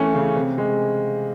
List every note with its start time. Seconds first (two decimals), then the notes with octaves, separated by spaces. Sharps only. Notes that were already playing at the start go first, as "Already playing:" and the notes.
Already playing: E3 A3 C#4
0.14 C#3
0.35 C3
0.58 G#3